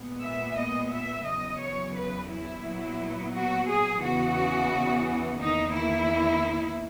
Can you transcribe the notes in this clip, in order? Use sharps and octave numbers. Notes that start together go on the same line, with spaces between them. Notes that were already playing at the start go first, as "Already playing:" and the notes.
Already playing: A#2 G#3 B3
E5
D#5
E5
E2 C#3 F#3 D#5
C#5
B4
E4
A#2 F#3 B3
F#4
G#4
E2 C#3 E3 B3 F#4
E2 D#3 A#3 D#4
E4